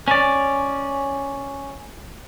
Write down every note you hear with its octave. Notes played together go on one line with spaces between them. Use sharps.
C#4 D5